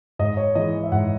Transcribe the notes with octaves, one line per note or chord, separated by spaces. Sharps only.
G#2 D#5
C#5
E3 G#3 D#5
E5
G#2 F#5